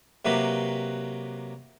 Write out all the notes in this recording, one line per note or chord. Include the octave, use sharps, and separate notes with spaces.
C3 F#3 A#3 G4 B4